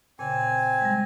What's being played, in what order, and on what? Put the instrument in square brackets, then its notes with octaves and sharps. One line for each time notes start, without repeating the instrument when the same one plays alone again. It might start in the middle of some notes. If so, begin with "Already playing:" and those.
[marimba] A#2 C#3 [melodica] C4 G#5
[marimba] G3 G#3